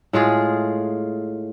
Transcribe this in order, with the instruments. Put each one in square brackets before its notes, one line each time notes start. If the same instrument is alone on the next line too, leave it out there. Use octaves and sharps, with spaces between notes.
[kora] A2 G#3 F4 G#4